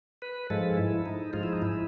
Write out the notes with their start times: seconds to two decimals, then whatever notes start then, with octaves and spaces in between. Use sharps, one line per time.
0.22 B4
0.50 G#2 F3 G#3 A4
0.77 E4
1.06 D#4
1.33 G#2 F3 G#3 F4
1.43 E4
1.53 D#4
1.62 E4